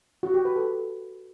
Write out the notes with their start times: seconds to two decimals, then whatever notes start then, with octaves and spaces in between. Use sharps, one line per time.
0.23 F#4
0.34 G4
0.45 B4
0.56 A4